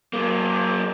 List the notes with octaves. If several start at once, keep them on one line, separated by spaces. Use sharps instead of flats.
F#3 A#3